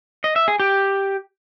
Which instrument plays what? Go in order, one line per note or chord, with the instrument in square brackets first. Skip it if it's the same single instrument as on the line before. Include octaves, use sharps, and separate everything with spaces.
[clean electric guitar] D#5
E5
G#4
G4